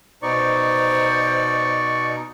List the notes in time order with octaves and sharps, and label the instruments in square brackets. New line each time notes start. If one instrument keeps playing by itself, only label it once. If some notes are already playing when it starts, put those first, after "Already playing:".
[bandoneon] B2 D#4 [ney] C5 [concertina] D5 C#6